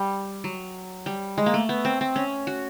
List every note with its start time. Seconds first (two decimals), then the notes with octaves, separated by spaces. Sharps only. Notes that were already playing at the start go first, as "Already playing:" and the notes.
Already playing: G3
0.44 F#3
1.06 G3
1.38 G#3
1.46 A#3
1.54 A3
1.69 B3
1.85 C4
2.01 C4
2.16 C#4
2.47 F#4